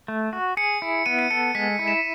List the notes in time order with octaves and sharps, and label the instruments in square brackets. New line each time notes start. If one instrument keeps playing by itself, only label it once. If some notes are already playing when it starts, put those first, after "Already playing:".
[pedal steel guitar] A3
F#4
[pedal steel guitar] G#4 [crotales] C#7
[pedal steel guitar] E4
[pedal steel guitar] B3 [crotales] D#7
[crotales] C#7
[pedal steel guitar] A4 [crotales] C#7
[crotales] C#7
[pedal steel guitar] G#3 [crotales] B6
[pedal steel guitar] E4
[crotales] E7